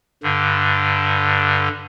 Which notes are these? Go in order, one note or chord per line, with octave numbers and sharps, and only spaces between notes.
G2 D3